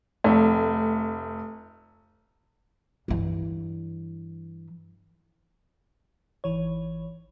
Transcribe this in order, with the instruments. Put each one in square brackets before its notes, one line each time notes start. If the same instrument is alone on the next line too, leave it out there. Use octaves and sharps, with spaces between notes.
[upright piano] F1 A3
[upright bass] G2 E3
[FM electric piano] G#1 E3 C#5